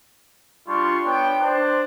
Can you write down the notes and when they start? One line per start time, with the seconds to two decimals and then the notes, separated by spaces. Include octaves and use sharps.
0.67 G3 D4 F4 C6 C#6
1.05 B3 D4 C#5 G5
1.41 D4 C5